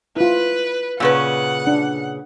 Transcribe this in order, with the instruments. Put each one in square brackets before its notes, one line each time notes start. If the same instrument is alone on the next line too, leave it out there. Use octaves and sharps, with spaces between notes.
[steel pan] E4 F4 [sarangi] B4
[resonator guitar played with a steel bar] A#2 C#3 B4 [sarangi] F#5
[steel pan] D4